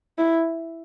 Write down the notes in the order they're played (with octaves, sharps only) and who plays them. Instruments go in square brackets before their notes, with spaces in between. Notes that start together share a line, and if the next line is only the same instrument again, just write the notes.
[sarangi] E4